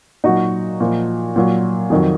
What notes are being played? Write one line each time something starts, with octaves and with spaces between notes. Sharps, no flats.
A#2 F#3 D#4 F#4
A#2 F3
A#2 F#3
F2 D#3 F#3